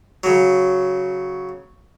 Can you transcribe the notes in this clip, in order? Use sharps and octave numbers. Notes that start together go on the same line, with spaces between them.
C#3 F#3